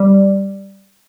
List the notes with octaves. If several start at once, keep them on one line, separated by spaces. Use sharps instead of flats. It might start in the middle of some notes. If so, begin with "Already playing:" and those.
Already playing: G3